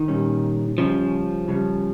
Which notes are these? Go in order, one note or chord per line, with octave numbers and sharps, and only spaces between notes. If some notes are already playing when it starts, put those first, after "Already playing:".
Already playing: D#3
A#2 G3 C#4
C#3 F3 G3 C#4
C#3 G3 C#4